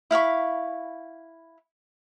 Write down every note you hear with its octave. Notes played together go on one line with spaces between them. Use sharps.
E4 F5 B5 C#6